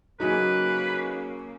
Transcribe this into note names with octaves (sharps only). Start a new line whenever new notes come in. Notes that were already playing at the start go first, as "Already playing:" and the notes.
C#3 F#3 A#3 D#4 F#4 G#4 B4